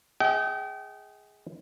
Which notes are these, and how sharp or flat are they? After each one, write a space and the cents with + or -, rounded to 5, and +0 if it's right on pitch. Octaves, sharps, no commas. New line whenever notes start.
G#4 +0 D#5 +45 G5 -35